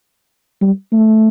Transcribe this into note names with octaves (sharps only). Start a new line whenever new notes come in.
G3
A3